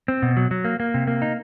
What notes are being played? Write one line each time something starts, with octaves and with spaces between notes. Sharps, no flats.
C4
B2
F#3
F#3
A#3
A#3
C3
A#3
D#4